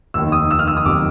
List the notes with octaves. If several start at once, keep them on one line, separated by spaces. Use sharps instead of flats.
F1 D#2 D#3 E6
D#6
E6
F6
E6
D#6
F#1 F2 C3 D#3 D6